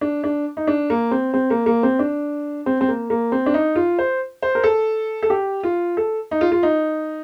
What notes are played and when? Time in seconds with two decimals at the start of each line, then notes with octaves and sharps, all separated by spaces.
0.01 D4
0.24 D4
0.57 D#4
0.67 D4
0.90 A#3
1.11 C4
1.34 C4
1.50 A#3
1.66 A#3
1.83 C4
1.99 D4
2.66 C4
2.81 C4
2.88 A#3
3.10 A#3
3.32 C4
3.46 D4
3.54 D#4
3.75 F4
3.98 C5
4.42 C5
4.55 A#4
4.64 A4
5.23 A4
5.30 G4
5.63 F4
5.97 A4
6.31 D#4
6.41 F4
6.52 F4
6.63 D#4